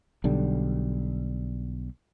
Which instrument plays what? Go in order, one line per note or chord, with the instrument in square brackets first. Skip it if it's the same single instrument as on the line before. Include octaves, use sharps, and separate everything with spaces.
[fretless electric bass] B1 D3 G3